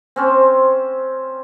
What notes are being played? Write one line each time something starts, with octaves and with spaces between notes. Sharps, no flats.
C4 C#4 C5